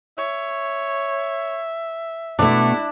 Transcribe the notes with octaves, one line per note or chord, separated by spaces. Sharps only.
C#5 E5
B2 A3 D4 E4